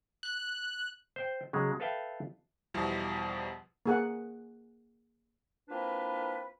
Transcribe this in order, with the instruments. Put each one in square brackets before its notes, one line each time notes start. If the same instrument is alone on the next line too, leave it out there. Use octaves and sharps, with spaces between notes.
[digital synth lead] F#6
[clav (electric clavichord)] C5 G5
C#3 F#3 G#3
A4 B4 E5 F5 G5
[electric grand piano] E2 B2 F3 G3 E4
[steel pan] A#3 G#4 F#5
[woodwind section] A#3 C4 D4 E4 F4 B4